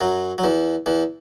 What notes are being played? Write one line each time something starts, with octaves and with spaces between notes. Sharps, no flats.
F#2 F#3
F#3
E2 E3
E2 E3